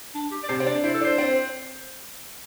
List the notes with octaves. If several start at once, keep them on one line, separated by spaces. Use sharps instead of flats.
D4
G4
D5
C3 C5
C4
D4 D5
E4 C5
A4
D4 C5
C4